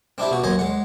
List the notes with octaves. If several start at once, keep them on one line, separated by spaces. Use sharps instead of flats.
C4 D4 E4 G4
B2 F#4
D#2 F#3 C5 D#5 G#5
G#3 F#5